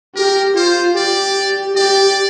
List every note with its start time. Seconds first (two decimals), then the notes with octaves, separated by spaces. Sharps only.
0.16 G4 A#4
0.56 F4 C5
0.96 G4 D5
1.76 G4 D5